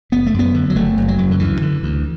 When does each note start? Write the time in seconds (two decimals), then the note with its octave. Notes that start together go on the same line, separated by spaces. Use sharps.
0.12 F#1 B3
0.26 A3
0.34 F#2
0.39 B3
0.54 D3
0.70 F#3
0.76 F#1 A3
0.97 F#1
1.08 F#3
1.18 F#2
1.31 D3
1.40 D2 E3
1.62 D3
1.83 D2